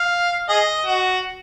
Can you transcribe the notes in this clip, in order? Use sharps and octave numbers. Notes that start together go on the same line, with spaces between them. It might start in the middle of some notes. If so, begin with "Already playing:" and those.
Already playing: F5
G#4 D#5
F#4